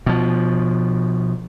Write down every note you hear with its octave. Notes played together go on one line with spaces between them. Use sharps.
B2 F3